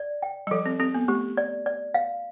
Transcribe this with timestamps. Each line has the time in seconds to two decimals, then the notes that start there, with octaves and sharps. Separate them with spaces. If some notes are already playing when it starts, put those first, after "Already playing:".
Already playing: D5
0.22 G5
0.47 G3
0.51 F3 A4
0.66 C4
0.80 C4 A4
0.95 B3
1.08 A3 G4
1.37 D5
1.66 D5
1.94 F5